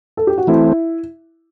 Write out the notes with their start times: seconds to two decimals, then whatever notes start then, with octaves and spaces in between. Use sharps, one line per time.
0.17 A4
0.27 G4
0.38 F#4
0.47 E3 A3 C4 E4